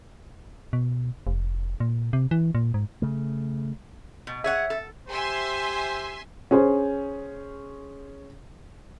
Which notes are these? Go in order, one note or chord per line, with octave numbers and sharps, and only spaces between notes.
B2
F1
A#2
C3
E3
A#2
G#2
C#3 A3
B2
G#4 C#5 E5 F#5
A4
G4 C5 E5 G#5 C6
C#4 G#4 C5